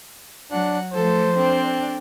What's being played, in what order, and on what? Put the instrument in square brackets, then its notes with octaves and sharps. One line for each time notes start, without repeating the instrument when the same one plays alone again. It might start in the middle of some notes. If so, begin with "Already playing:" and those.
[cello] F#3 [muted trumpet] D4 [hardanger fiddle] F#5
[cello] F3 A3 [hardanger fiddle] A4 [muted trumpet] C5
[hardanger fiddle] C4 [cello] D4